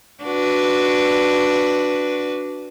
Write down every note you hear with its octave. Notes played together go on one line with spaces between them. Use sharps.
D4 F#4 B4